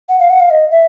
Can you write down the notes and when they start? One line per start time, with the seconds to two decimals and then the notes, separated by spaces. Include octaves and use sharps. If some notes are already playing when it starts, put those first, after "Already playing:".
0.09 F#5
0.20 F5
0.30 F#5
0.40 F5
0.50 D#5
0.71 E5